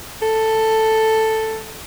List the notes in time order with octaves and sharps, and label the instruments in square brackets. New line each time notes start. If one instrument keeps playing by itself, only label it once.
[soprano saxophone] A4